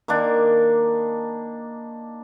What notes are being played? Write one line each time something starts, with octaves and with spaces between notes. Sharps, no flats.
D#3 A#3 D4